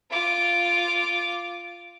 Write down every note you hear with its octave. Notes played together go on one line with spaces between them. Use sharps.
F4 D6